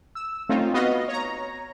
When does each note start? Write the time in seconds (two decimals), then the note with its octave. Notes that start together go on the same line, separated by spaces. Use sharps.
0.15 E6
0.49 A3 C4 C#4 D#4 F4
0.74 B3 F#4 D#5 F5
1.08 C#5 A#5